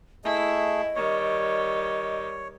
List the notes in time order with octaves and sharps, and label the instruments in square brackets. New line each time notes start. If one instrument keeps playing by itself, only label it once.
[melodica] A3 G#4 [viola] E4 [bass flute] D#5
[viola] D#3 G3 [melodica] C#5